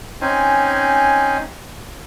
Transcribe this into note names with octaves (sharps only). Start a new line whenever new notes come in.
C4 C#4 D#4 C5 G#5